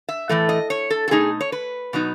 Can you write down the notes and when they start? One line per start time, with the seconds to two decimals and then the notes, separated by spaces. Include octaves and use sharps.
0.09 E5
0.29 A2 E3 A3
0.49 D#5
0.70 C#5
0.90 A4
1.08 A4
1.11 B2 A3 D#4 G#4
1.41 C#5
1.52 B4
1.93 B2 F#3 B3 D#4